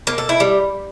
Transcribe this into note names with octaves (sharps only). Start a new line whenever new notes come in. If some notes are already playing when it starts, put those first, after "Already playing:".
A#3
A4
E4
G3